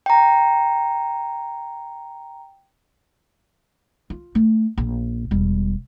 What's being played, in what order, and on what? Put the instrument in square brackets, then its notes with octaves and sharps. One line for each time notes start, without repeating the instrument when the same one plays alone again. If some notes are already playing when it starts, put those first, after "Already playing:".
[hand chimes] G5 A#5
[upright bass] F4
A3
A#1
E1 G3